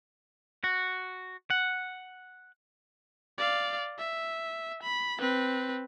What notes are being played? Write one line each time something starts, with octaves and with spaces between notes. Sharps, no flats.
F#4
F#5
D5 F5
E5
B5
C4 B4